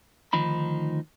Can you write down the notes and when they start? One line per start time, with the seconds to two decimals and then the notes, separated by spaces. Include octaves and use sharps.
0.33 D2 D#3 F3 D#4 B5